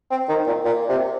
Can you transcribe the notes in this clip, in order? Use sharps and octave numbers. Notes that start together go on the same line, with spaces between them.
C4
D#3
A#2
A#2
C3